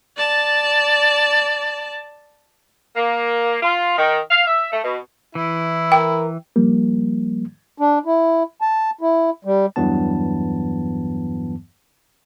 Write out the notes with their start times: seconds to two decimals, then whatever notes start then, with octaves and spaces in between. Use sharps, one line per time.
0.17 D5 A5
2.96 A#3
3.62 F4
3.98 D#3
4.30 F5
4.47 E5
4.72 A3
4.84 B2
5.35 E3 E4
5.92 A#4 G5
6.56 F3 G3 A#3
7.78 D4
8.06 E4
8.61 A5
9.01 E4
9.45 G3
9.76 E2 G2 E3 F#3 B3 A5